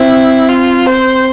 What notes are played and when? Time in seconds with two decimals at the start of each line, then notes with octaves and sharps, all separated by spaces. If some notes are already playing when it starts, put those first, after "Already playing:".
Already playing: C4 E4
0.48 F4
0.87 C5